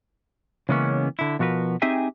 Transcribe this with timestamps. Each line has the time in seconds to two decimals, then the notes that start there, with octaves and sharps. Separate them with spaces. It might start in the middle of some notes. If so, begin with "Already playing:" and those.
0.69 C#3 E3 G#3 A#3 B3 C#4
1.19 D3 E4
1.39 B2 F3 F#4 A#4 B4
1.82 C4 D#4 G4 G#4 E5 G#5